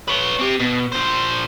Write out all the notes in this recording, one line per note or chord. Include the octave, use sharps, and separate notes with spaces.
B4 C#5
C4 G4
B2
A#2 C5